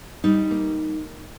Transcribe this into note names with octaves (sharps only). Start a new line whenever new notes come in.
G3 D#4
A#3